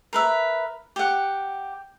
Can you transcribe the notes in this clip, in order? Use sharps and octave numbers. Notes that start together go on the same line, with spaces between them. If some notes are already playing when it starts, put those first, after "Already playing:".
A#4 B4 E5
G4 F#5